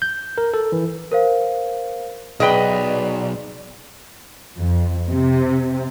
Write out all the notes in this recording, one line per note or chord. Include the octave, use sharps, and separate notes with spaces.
G6
A#4
A4
E3
A#4 C5 F5
B1 G#4 B4 D5 D#5 G5 G7
F2
C3